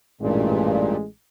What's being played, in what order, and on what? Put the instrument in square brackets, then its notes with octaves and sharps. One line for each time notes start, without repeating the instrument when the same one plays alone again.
[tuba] A1 [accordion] G2 A#2 [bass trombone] G#3